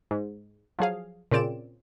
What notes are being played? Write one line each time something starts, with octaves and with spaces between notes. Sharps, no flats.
G#2
F3 F#3 G#4 F5
A#2 C#3 C4 D5 D7 E7